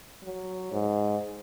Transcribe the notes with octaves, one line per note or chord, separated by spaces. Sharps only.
F#3
G#2